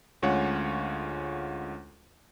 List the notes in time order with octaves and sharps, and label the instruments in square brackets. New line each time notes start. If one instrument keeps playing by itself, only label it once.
[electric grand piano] D2 G#3 C#4 F4 C#5 F#5